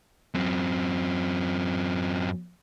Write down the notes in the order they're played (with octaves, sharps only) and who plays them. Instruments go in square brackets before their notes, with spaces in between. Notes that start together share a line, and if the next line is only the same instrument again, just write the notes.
[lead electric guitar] F#2 C4